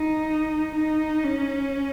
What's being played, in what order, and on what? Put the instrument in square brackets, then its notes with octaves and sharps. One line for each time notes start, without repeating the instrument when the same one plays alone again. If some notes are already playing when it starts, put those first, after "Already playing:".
Already playing: [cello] D#4
D#4
C#4